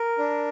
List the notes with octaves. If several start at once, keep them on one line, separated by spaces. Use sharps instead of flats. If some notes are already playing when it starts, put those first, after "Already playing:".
Already playing: A#4
D4